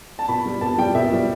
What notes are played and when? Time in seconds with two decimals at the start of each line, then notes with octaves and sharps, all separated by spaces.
0.19 A5
0.29 B2 B5
0.46 G3
0.61 B2 A5
0.78 G3 G5
0.95 B2 E5
1.13 G3